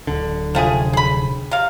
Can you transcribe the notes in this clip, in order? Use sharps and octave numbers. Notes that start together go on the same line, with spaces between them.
D1 D3
F1 F3 A3 G#4 G5 D#7
G#4 B5
C3 F5